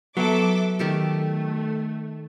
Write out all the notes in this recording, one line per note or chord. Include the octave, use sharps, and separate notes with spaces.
F#3 B3 A4 E5 D6
D#3 A3 G4 A4